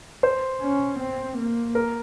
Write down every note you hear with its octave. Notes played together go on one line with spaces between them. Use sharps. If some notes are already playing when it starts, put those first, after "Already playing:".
C5
C#4
C4
A#3
A#4